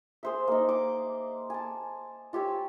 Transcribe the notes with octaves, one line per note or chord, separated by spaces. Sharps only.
G#4 C5 E5
A#3 D#4
D6
G#5 A5
F4 G4 C#5 E6